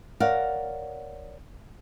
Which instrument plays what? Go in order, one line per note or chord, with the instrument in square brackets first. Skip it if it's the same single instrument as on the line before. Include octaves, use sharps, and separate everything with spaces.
[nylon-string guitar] A#4 C#5 D5 F5 F#5